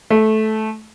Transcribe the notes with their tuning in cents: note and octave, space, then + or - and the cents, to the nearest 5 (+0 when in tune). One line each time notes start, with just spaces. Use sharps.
A3 -15